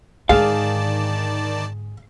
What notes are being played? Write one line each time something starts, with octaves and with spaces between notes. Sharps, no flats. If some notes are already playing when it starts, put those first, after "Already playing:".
G#2 D3 D#3 G#4 D5 F5 A5